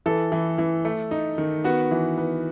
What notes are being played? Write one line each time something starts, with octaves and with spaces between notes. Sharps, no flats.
E3 A4
E3
E3
A3
D#4
D#3
B3 F#4
E3
B3